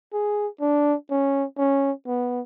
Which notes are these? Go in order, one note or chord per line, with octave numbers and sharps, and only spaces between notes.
G#4
D4
C#4
C#4
B3